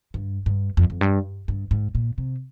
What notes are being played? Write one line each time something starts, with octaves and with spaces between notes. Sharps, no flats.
G2
G2
F2
F2
G2
G2
G#2
A#2
C3